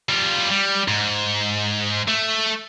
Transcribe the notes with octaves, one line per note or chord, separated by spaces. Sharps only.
G3 F4
G3
G#2
A3